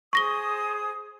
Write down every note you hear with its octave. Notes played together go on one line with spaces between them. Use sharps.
G#4 C5 C#6 D#6 A#6 G7